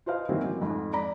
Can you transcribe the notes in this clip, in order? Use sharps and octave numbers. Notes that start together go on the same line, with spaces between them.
F4 B4 C5 D#5 F5
D#3 E3 F#3 A#3 C4
A1
F2 G#2
D5 A#5 B5